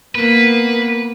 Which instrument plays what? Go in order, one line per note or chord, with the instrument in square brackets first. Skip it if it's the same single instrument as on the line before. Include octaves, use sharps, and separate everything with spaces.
[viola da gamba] A#3 B3 [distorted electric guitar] B4